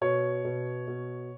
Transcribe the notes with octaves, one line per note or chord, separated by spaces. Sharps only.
B2 C#5
B2
B2